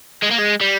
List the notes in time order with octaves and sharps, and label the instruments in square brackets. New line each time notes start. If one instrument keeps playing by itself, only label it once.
[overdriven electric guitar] G#3
A#3
G#3
G3